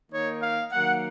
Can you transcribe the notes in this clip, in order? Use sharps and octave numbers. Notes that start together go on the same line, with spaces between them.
D#3 A#3 D#4 C#5
F5
D#3 F#3 A#3 F#5